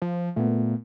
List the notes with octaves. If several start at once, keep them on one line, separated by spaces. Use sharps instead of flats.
F3
A#2 A3 B3